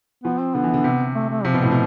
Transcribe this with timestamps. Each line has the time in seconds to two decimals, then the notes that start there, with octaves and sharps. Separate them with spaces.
0.24 F3 B3
0.40 C4
0.55 D3 B3
0.64 E3
0.74 D3
0.84 C3
1.15 A3
1.29 A3
1.45 C3 F3
1.54 B2
1.63 A2
1.71 B2